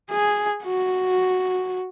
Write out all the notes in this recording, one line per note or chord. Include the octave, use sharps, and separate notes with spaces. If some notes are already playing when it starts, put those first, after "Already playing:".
G#4
F#4